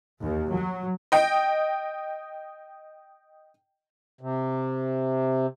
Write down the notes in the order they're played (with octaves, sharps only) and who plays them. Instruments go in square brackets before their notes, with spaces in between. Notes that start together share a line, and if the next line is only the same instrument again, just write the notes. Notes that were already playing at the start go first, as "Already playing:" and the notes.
[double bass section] D#2
F#3
[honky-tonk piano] D#5 G5
[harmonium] C3